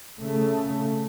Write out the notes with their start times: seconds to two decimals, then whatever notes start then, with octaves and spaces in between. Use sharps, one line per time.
0.20 C#3 A3